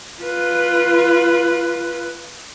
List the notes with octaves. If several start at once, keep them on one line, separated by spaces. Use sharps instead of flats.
F4 B4